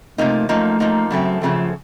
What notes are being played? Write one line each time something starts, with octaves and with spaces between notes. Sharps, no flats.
C3 F3 A3 A#3 D#4
F#2 F3 A3 A#3 D#4
F#2 F3 A#3 D#4
F#2 C#3 F#3 A3 C4
F#2 C#3 F3 A3 C4